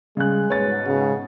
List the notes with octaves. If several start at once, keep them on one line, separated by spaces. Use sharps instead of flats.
C#3 G3 G#3 F#6
G#2 B2 B4 C#5 A6
C#3